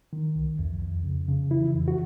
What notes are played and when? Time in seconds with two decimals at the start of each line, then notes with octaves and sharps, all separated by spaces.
0.13 D#3
0.36 C2
0.59 F2
0.82 F2
1.04 C#3
1.28 C#3
1.51 E3 E4
1.75 F2
1.88 F#4